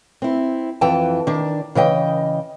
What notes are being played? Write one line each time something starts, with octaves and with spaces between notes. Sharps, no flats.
C4 E4
F2 E3 G5 A5
D#3 D4
C#3 E3 D#5 G5